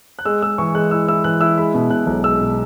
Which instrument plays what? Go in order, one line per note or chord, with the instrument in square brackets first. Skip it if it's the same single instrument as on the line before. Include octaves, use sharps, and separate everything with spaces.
[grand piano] F#6
G#3 E6
G#3 E6
E3 C#6
G#3 F#6
E4 E6
E4 E6
E3 F#6
E4 E6
G#3 B5
B2
B2 F#6
B1
G#3 E6
B2